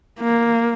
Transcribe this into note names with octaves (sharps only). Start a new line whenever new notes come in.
A#3